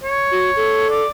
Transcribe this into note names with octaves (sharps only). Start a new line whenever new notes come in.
C#5
F#4
A4
D5